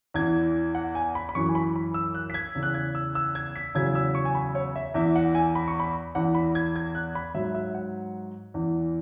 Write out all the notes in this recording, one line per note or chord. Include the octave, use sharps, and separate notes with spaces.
E2 E3 G#6
F#5
G#5
B5
B5
F#2 E3 C#6
G#5
B5
B5
E6
F#6
B6
G#6
E2 C#3 E3
F#6
G#6
E6
E6
G#6
B6
E2 C#3 F#3 G#6
E6
C#6
G#5
B5
C#5
E5
E2 E3 E5
F#5
G#5
B5
C#6
B5
E2 E3 F#5
B5
G#6
G#6
F#6
B5
G#2 F#3 E5
E5
F#5
E2 E3